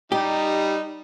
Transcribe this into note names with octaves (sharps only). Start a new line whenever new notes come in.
G3 D#4 G4